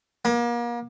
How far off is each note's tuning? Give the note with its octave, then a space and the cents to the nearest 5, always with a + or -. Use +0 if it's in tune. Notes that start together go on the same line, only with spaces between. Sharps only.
A#3 +35